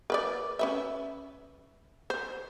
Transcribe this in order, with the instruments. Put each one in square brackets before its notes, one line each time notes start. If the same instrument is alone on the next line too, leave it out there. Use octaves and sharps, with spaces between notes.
[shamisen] A#4 B4 D5
C#4 B4 E5
C5